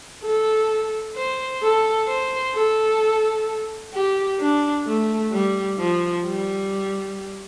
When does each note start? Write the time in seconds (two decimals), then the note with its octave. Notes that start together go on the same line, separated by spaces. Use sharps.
0.23 A4
1.15 C5
1.62 A4
2.08 C5
2.54 A4
3.93 G4
4.39 D4
4.86 A3
5.32 G3
5.79 F3
6.25 G3